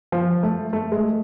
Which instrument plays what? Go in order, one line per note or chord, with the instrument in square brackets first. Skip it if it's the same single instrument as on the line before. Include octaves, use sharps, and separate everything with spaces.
[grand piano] F3
A3
A3
G#3